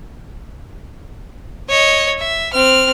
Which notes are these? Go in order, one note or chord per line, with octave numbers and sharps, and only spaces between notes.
C#5 D#5
E5
C4 F6